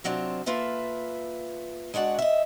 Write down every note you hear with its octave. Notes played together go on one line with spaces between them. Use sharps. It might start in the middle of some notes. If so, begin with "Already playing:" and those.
C3 F#3 C4 D4 F4
A#3 F4 A4 B4 E5
G#3 D4 F#4 D5 F#5
D#5 E5